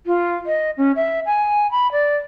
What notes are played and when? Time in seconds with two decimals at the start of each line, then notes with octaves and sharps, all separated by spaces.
0.06 F4
0.46 D#5
0.77 C#4
0.96 E5
1.26 G#5
1.71 B5
1.92 D5